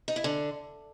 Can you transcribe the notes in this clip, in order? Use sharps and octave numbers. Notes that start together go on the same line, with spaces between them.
D#4
E4
D3